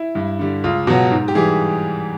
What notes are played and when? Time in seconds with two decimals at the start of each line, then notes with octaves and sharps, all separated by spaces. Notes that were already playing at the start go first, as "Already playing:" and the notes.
Already playing: E4
0.15 G2
0.39 D3 G3
0.64 C#2 F4
0.87 B2 F#3 F#4
1.11 G#2
1.28 G4
1.35 E3 G3 G#4